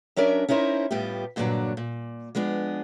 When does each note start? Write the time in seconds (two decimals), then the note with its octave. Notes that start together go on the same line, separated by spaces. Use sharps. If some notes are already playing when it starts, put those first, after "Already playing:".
0.16 F#3 C#4 D4 A#4 E5
0.48 C#4 D#4 E4 A#4 C5
0.91 A2 G3 B3 F4 G4
1.36 G2 A#2 D3 F3 F#3 D4
1.77 A#2
2.35 F3 G#3 B3 D4